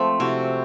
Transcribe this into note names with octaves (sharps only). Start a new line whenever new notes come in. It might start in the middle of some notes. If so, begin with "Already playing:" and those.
Already playing: F3 G#3 A3 C4
C3 E4 F#4